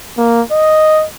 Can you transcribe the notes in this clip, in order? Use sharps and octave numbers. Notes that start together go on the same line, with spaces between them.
A#3
D#5